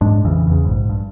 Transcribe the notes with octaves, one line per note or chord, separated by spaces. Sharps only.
G#2 G#3 D4
A#1 F2 C#3 E3
E2 C#3
A#1 G#2
G2